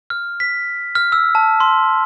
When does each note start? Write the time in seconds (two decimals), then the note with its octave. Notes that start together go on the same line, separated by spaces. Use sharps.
0.10 F6
0.40 B6
0.95 F6
1.12 E6
1.35 A5
1.60 C6